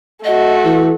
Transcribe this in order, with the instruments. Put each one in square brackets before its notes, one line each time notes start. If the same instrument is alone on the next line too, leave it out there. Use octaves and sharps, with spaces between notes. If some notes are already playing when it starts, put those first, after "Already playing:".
[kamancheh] A3 F#4 [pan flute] D#5
[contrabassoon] E3 [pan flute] A4